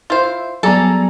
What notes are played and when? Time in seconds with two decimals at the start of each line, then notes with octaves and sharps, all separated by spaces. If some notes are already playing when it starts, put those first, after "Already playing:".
0.10 E4 F4 C5
0.63 F#3 G3 B3 G#4 A4 D5 A#5